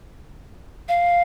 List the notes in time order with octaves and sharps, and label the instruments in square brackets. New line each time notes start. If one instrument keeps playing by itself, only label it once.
[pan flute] F5